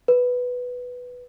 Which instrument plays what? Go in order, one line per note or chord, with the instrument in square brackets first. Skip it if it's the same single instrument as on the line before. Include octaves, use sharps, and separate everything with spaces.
[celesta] B4